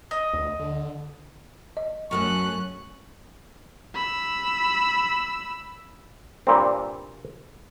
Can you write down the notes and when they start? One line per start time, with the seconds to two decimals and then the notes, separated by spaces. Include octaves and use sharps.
0.11 D#5
0.33 D2
0.60 D3
1.77 D#5
2.11 F#2 F#3 A3 C#4 C#6 F#6
3.95 B5 E6
6.47 G2 A#2 C4